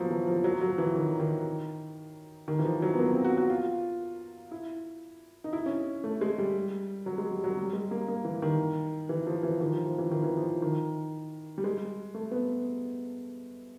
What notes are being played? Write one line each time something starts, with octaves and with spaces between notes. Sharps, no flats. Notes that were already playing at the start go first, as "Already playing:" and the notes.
Already playing: F3 F#3 A#3 B3
E3
F3
F#3
F3
F#3
E3
D#3
D#3
D#3
E3
F3
F#3
B3
A#3
C4
F#4
F#4
F4
E4
D#4
E4
C#4
A3
G#3
G3
F#3
G#3
G3
F#3
G3
G#3
A#3
A#3
E3
D#3
E3
F3
E3
D#3
F3
F3
E3
D#3
E3
F3
D#3
G3
G#3
A3
B3